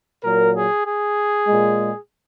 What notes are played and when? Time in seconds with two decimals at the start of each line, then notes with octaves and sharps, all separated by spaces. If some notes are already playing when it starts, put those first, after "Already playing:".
0.23 A#2 F#3 A#4
0.54 G#4
0.86 G#4
1.48 A#2 G#3